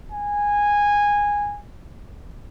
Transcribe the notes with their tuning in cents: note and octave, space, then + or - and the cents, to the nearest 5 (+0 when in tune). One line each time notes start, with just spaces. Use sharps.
G#5 -15